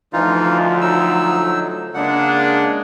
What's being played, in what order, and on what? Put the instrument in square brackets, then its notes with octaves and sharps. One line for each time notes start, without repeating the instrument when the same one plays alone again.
[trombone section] D2 F3 [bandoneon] E3 D#4 F4
[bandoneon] F#3 D#4 E6
[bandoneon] C#3 F#5 [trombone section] G#3 A#3 D4